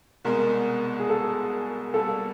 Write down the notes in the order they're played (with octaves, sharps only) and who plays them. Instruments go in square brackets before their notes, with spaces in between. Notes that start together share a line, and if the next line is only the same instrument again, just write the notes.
[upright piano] C2 B2 G#3 [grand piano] A#4
[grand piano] G#4
A4
[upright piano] B2 G3 A#3 [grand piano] A4